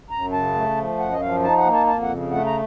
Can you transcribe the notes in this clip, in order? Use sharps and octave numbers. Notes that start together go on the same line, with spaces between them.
F#2 A#5
C#3 A5
A3
F3
F#2 F#5
D#5
F3 F5
D#4 A5
F#5
A#3
A5
F2 A5
F#5
C#3
A3 F#5
A#5